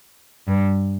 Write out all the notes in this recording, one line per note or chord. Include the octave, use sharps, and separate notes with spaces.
G2